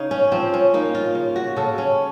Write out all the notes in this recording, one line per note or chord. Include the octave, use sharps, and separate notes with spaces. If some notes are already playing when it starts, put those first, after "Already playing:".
Already playing: C#3 D#4 C#5
C#4
F3 C4
C#4
A#3 D#4
F4
C#3
F#4
C#3 A4
C#4